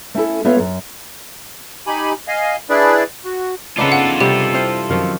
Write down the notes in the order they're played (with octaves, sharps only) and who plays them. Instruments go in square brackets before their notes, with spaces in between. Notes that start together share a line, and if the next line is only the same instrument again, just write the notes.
[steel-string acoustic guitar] A3 C#4 E4 A4
A3 B3 F4 A4 C#5 F5
F#2
[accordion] D#4 G4 G#5 B5
D#5 F5 G#5
D4 E4 G#4 B4 D5
F#4
[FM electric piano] C#3 B3 D#4 [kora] D4 B4 [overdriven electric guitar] F4 A4
[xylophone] F#5
[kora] C3 G3 [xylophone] G4
[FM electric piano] C4 E4 C5 [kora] F5
[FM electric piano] F#2 F5 C#6 [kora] D#3 F3